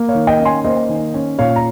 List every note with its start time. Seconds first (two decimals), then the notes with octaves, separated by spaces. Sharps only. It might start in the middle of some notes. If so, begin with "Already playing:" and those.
Already playing: A#3
0.09 C#5 F5
0.15 D#3
0.27 D#5 G5
0.40 C#4
0.45 G#5 C6
0.64 A#3 C5 D#5
0.89 D#3
1.14 C#4
1.39 A#2 C#5 F5
1.56 A#5